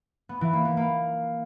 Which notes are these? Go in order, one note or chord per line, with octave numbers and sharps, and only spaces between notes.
B3
E3
A#3
B3
A#3